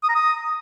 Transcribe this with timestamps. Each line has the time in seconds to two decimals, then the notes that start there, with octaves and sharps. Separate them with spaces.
0.03 D#6
0.09 A#5
0.15 D#6